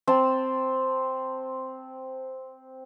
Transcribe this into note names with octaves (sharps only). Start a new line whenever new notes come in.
C4 A5